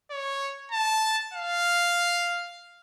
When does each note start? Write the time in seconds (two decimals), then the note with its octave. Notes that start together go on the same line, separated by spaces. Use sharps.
0.11 C#5
0.72 A5
1.33 F5